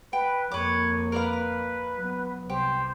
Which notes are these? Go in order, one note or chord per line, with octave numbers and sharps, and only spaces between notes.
B4 G5
F2 A#3 B4 C#5 D6
A#4 B4 D5 F5
F#3 B3
C2 G4 C5